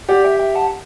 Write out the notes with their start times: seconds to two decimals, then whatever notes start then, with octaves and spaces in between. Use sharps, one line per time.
0.09 G4 D5 F#5
0.24 E5 G5
0.40 E5 G5
0.55 F#5 A5